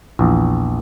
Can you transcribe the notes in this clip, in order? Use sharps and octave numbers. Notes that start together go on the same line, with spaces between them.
A#1 E2